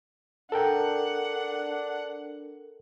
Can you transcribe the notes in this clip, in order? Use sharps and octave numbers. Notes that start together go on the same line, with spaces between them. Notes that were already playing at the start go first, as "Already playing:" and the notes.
D4 A4 A#4 F#5 G5